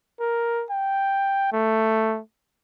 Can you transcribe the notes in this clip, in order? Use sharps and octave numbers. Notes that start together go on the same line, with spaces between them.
A#4
G5
A3